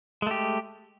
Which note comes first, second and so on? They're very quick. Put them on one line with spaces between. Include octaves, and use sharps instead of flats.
G#3 A3 G4